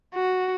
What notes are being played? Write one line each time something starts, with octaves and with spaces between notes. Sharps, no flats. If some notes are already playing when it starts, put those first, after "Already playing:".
F#4